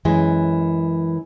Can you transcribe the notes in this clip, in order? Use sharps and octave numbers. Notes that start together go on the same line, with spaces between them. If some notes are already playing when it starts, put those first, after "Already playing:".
F#2 E3 G#3